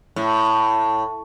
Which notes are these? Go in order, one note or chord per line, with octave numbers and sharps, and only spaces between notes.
A2